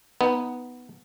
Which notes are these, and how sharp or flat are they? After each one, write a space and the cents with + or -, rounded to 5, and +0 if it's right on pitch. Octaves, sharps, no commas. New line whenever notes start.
B3 +0 D#4 +10